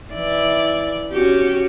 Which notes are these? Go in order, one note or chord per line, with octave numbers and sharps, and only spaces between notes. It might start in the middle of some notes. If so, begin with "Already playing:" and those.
E3 E4 D5
C#4 F#4 G4